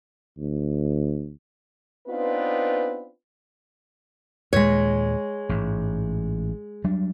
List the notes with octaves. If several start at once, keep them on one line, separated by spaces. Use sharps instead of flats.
D2
B3 C4 D4 D#4 F4 B4
D#2 A#2 G#3 C#5
A1 G#2
F#3 G3 D4